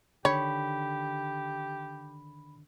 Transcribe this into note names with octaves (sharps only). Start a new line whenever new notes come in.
D3 D#3 G4 C#5 B5